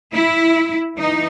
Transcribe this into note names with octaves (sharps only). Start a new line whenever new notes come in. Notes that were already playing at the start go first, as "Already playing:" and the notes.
E4
E3 D#4